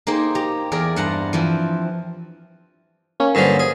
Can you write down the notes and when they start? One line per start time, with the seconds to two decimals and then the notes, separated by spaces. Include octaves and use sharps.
0.07 A#3 D#4 G4 G#4 C5
0.35 G4 A#5
0.72 E2 G#4 A#4 D5
0.96 G2 C5 F#5 A5 A#5
1.33 E3 F3 C4
3.20 A#3 C#4
3.35 G2 D3 F3
3.59 G#4